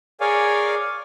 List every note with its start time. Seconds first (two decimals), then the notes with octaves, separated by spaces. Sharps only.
0.20 G#4 A#4 C#5 D5 F5 G#5